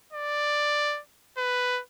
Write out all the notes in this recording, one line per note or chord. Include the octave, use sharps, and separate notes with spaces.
D5
B4